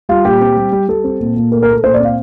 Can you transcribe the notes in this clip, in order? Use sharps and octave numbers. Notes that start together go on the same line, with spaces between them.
G3 F4
A#2 G4
C4
G3
G3
G3 A4
C4
A#2
A#2
A3 A#4
A#4
A3 A4
A#2 C5
D5
C4
F5